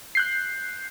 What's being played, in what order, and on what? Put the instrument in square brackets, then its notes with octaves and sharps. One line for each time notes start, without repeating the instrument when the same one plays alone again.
[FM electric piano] F#6 G6 C7